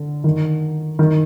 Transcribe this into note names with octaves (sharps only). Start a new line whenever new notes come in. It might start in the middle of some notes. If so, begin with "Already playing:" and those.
Already playing: D3
D#3
D#3